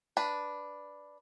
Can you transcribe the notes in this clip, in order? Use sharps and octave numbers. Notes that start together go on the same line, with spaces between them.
D4 B4